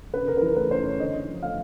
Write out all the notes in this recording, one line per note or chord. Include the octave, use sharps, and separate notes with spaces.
C#3 B4
C#3 A#4
B4
E3 A#4
A3 B4
C#3 C5
C#3 C#5
D3 D#5
D3
F3
A3 F5